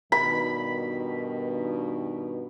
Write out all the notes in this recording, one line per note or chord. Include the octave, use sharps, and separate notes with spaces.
G2 B2 D#3 B5